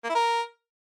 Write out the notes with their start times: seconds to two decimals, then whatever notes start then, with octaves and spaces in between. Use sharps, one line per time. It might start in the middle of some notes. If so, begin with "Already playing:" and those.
0.04 A#3
0.09 E4
0.15 A#4